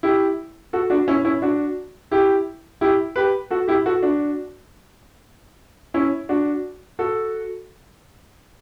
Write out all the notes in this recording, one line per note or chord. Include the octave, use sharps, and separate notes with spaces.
E4 G4
F#4 A4
D4 F#4
C#4 E4
C#4 E4
D4 F#4
E4 G4
E4 G4
G4 B4
F#4 A4
E4 G4
F#4 A4
D4 F#4
C#4 E4
D4 F#4
F#4 A4